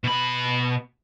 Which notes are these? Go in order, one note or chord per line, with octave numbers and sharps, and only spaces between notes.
B2 B5